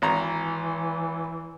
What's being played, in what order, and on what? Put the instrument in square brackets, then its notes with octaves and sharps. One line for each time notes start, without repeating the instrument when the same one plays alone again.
[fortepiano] G#1 A#5 [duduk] E3